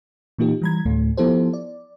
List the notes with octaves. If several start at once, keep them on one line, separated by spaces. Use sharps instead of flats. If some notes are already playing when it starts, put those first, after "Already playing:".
A#2 E3 A#3 D#4 F4 G4
E3 G3 A#5 B5 G#6
D2 A2 A3
F3 B3 E4 G4 A4 C5
D5